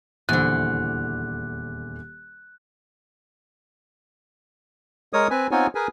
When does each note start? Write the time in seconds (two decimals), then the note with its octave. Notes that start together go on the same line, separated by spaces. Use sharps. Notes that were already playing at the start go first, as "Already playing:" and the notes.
0.29 D#1 E2 D3 C5 F#6
5.13 G#3 A#4 C#5 D#6
5.30 C4 B4 G#5
5.51 B3 C4 D#4 F4 C#5 G#5
5.75 G#4 A#4 B4 G#5